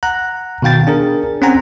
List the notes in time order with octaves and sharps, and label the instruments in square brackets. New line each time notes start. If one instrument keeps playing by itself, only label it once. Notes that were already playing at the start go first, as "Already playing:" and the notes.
[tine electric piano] F#5 A#5 F#6
B2 D#3 F5 G5 A6
D4 G#4 A#4
C4 C#4 C5 F#5 G#5 A#5